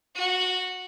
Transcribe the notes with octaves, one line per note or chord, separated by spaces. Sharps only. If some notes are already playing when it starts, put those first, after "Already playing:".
F#4